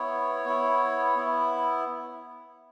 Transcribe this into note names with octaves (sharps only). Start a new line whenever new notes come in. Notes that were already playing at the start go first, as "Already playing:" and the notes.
Already playing: B3 E4 C#5
B3 E4
B3 E4